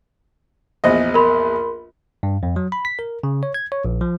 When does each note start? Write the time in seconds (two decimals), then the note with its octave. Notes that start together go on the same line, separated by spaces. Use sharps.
0.84 A#1 E2 C5 D#5 A#6
1.14 A#4 B5 C6
2.23 G2
2.43 F2
2.56 F#3
2.72 B5
2.85 B6
2.99 A#4
3.23 C#3
3.43 C#5
3.54 G#6
3.72 C#5
3.85 A#1
4.01 F3